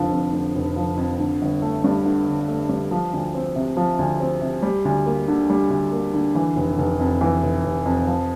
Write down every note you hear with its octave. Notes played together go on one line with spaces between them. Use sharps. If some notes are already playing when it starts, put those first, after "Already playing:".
Already playing: F1 D3 F3
F2
D3
F1
F3
F2
D3
G1
A3
G2
D3
G1
A3
G2
F3
D2
C4
C3
F3
D2
C4
C3
G3
D2
A#3
D3
G3
D2
A#3
D3
E3
F1
F1
F2
E3
F1
F1
F2
F3